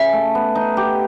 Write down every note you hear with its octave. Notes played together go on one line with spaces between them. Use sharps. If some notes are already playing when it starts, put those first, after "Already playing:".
Already playing: C#3 E5
A3
B3
D#4
G4